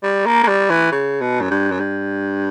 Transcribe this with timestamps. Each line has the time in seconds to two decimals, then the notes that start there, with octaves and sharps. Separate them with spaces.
0.03 G3
0.26 A#3
0.44 A#3
0.48 G3
0.70 E3
0.92 C#3
1.21 B2
1.41 F#2
1.50 G2
1.71 F#2
1.80 G2